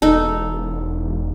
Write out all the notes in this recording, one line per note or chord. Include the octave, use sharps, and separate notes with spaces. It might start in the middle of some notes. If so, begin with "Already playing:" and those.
E1 D#4 A4